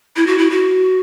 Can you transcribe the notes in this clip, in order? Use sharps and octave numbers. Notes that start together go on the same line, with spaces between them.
E4
F#4
E4
F#4